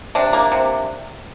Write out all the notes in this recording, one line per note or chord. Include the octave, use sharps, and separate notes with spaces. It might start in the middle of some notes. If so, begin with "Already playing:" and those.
C3 D4
A#3
C3